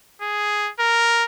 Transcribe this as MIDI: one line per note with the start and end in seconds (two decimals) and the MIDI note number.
0.22 0.71 68
0.80 1.24 70